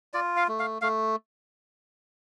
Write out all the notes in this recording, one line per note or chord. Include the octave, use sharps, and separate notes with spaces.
F4 D5
F5
A3
F5
A3 F5